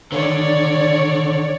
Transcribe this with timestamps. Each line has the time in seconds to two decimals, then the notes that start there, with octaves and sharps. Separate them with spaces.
0.12 D3 D#3 C#5 D5